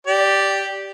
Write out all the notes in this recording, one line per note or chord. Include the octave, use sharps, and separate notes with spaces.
G4 D5